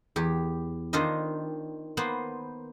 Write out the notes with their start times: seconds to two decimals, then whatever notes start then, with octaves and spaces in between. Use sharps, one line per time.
0.16 E2 G4
0.93 D#3 D4 F4 C5 D#5
1.97 A#3 B3 C5